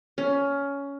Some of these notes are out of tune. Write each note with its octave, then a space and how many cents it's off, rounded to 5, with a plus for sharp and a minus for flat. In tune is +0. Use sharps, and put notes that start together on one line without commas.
C#4 +15